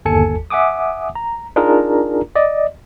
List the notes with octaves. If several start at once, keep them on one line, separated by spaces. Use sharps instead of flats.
G1 D#2 A4 G#5 A5 C#7
E5 F#5 G#5 D6 D#6
A#5
D4 D#4 F4 G#4 A#4 A#5
D5 D#5